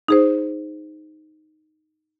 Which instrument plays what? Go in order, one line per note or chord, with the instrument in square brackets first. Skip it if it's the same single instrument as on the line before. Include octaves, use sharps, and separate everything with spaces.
[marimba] D#4 G#4 C5